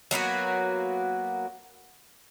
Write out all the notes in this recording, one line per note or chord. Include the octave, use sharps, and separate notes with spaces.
F#3 A#3 B3 F#4